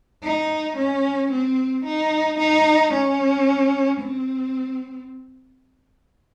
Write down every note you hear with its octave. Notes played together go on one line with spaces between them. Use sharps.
D#4
C#4
C4
D#4
D#4
C#4
C4